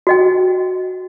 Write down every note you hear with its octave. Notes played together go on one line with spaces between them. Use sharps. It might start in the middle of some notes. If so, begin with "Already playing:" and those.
F#4 D#5 G5